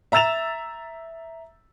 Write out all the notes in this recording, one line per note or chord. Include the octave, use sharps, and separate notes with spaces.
E5 A#5 E6 A6 E7 F7